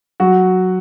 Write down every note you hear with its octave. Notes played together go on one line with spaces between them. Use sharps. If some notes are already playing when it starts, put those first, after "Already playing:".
F#3 F#4